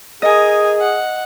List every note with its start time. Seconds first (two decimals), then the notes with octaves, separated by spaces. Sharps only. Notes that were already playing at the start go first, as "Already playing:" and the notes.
0.22 G#4 A#4 D#5 G#5
0.80 F#5